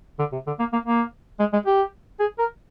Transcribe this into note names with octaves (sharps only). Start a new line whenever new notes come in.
D3
C3
D3
A#3
A#3
A#3
G#3
G#3
G4
G#4
A#4